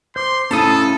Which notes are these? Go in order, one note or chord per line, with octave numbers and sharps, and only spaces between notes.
C5 C6 D6
A2 C#3 C#4 E4 A4 A5 D#6